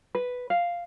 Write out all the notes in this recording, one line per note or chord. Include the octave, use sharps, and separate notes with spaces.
B4
F5